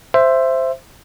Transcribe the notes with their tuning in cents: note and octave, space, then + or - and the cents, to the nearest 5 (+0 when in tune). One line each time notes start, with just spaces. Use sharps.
C5 +0 E5 +15